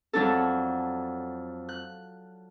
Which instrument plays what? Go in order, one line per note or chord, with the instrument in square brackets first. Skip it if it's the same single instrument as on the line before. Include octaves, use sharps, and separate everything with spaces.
[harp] F2 F#3 D4 A4
F#6